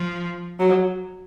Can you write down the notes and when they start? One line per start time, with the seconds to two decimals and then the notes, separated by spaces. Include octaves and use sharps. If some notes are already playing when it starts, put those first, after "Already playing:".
Already playing: F3
0.60 F#3